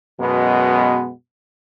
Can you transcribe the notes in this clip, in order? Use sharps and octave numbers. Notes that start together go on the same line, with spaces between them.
F#2 B2 G#3 B3